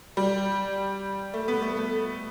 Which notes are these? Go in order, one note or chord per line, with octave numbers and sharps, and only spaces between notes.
G3
A3
B3
A3
A3